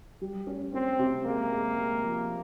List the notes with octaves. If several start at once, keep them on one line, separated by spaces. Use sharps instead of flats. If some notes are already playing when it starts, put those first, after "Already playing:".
G3
C#4
C4 C#4
C3
G#3 A#3
G#3
G#3
F3